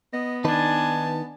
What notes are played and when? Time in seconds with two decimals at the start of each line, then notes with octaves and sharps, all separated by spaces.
0.13 B3 D#5
0.45 D#3 D4 D#4 B4 G#5 A5